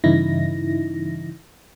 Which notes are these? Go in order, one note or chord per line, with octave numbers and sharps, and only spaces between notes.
G2 C#3 E3 D#4 E4 A#6